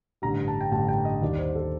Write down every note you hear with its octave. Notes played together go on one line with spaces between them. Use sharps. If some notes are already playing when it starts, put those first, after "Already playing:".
A1 G2 D3 G3 A#5
A5
G5
A1 G2 D3 G3 A5
G5
D#5
D#2 D#3 G3 D5
C5
A4